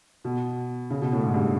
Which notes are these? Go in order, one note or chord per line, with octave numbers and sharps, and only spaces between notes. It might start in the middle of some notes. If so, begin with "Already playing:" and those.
B2
C#3
B2
A2
G#2
G2